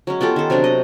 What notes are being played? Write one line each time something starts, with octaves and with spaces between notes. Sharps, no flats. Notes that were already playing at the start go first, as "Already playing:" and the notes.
F#3 G#3 C#4
B3 F4 G4 A4
D#3 A4
C3 F#3 B3 D4
D#5